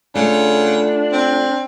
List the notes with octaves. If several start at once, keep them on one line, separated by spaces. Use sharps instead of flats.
C#3 A3 B3 D4 F4
C4